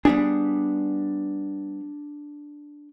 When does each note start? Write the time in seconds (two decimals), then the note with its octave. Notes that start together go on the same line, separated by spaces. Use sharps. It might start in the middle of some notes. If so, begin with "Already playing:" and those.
0.05 G3 B3 D4 G#4